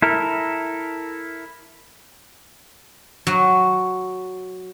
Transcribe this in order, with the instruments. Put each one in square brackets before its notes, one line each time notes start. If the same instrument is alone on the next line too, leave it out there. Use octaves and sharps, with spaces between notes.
[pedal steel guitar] E4 A4 A#4
[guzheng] F#3